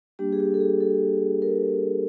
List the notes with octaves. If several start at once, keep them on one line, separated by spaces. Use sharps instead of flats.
G3 A#3 D4 G4
G#4
G4
A4
G#4
A4
A#4